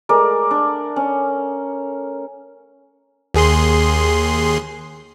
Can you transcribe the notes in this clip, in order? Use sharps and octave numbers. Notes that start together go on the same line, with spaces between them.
G#3 A3 A#4 D5
D4
C#4
D#2 G#4 C6